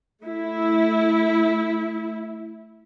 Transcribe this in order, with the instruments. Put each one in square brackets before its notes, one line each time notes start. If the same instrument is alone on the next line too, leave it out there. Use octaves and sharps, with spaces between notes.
[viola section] A3 E4